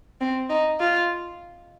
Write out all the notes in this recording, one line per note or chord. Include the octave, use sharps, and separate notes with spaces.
C4
D#4
F4